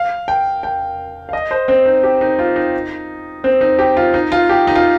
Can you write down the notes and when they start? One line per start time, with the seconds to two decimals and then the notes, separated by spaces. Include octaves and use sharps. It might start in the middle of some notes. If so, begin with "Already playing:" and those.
Already playing: F5
0.28 G5
0.63 G5
1.29 F5
1.33 D#5
1.51 C5
1.68 C4
1.86 D#4
2.03 G4
2.21 D#4
2.39 F4
2.56 D#4
3.44 C4
3.61 D#4
3.79 G4
3.97 F4
4.14 D#4
4.32 F4
4.49 G4
4.67 D#4
4.76 F4